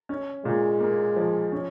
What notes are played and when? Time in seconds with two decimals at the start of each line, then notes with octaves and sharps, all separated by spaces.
0.09 C#4
0.45 A#2 G#3
0.80 A#3
1.16 F3
1.52 C#4